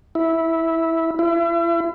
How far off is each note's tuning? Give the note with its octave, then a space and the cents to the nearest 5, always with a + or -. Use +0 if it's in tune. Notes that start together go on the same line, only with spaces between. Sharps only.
E4 -10
E4 +40